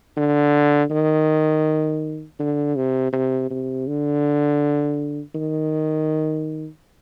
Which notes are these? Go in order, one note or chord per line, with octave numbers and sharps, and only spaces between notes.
D3
D#3
D3
C3
C3
C3
D3
D#3